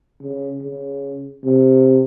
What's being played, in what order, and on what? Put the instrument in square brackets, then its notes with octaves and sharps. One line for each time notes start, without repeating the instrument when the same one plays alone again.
[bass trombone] C#3
C#3
C3